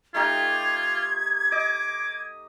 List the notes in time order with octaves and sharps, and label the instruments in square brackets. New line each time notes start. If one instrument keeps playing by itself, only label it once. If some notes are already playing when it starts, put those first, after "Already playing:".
[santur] A3 D#4 G4 [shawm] F4 [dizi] G#6
[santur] D#5 [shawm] D6